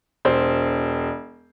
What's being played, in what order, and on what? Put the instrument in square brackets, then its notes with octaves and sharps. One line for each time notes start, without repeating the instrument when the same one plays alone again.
[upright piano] E1 C5